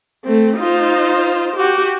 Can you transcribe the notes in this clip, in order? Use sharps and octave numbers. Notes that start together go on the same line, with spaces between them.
A3 C4
D#4 F4 C5
F#4 G4